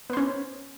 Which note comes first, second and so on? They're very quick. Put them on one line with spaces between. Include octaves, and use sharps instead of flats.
B3 C5 C#4